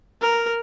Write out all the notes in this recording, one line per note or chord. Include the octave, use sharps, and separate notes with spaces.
A#4